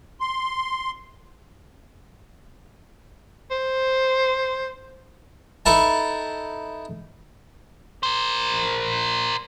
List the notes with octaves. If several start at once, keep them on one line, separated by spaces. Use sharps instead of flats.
C6
C5
D#4 E4 A4 B4 E5 A5
A#4 C5